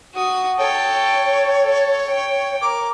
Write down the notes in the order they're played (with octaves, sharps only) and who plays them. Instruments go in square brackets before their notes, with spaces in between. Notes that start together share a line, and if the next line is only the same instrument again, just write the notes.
[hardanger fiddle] F#4 D#6
[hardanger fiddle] A4 G5 [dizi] C#5
[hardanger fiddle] A4
G5
[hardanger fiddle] A#4 [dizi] D6